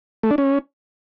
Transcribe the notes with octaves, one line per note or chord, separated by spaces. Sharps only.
A3
D4
C#4